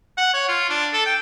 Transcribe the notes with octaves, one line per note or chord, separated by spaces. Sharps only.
F#5
C#5
F4
D4
A4
G5